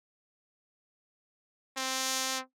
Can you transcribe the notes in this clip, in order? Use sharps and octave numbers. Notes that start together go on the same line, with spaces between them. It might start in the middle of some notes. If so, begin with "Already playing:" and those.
C4